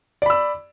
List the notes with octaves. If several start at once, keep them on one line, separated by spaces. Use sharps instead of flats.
D5 B5 E6